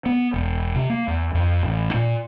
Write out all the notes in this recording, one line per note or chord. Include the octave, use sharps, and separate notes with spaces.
B3
E1
C3
A#3
E2
F2
A1
A#2